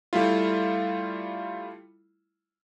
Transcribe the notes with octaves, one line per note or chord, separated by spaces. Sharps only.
G3 A3 E4 F4